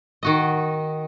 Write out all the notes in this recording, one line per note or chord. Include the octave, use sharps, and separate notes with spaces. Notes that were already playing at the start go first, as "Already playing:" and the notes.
D#3 F#4 D#5